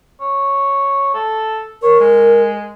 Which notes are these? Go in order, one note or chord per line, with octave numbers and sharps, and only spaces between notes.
C#5
A4
A#4 C#5
G#3